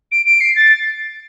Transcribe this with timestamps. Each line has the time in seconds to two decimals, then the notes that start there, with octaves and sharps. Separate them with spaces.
0.11 D7
0.26 D7
0.40 C7
0.55 A6